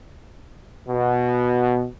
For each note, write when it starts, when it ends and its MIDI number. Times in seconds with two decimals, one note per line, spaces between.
0.88 1.86 47